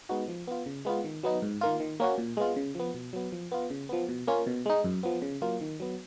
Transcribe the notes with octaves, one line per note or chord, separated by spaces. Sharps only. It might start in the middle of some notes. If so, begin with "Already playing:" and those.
G#3 B3 D#4 F#4
F3
B3 F4
C#3
G#3 B3 F4
D#3
F#3 B3 D#4
G#2
D#3 A#3 F4
D#3
A#3 C#4 F#4
A#2
G#3 B3 F4
C#3
F3 B3
B2
F#3 B3
F3
B3 F4
C#3
F3 B3
B2
A#3 C#4 F4
B2
G#3 D#4
F#2
F3 B3
C#3
F#3 A#3 F4
D#3
F#3 B3